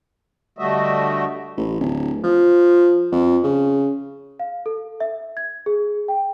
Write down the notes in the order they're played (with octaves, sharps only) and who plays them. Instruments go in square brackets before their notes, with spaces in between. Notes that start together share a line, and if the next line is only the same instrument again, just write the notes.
[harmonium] D3 G3 A3 F#4 D#5 E5
[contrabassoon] A1
D1
F3
F2
C#3
[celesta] F5
A4
E5
G#6
G#4
G5